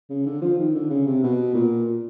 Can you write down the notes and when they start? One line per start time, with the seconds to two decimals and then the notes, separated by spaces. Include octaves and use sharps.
0.10 C#3
0.26 D3
0.42 F3
0.58 D#3
0.75 D3
0.90 C#3
1.07 C3
1.23 B2
1.55 A#2